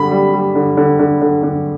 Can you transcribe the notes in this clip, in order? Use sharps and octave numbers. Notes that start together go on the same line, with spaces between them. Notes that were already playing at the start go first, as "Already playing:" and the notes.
Already playing: D3 G3 B5
G3
G3
D3
D3
D3
D3
D3